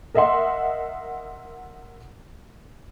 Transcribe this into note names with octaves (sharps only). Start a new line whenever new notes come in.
A#4 D#5 E5 F#5 C6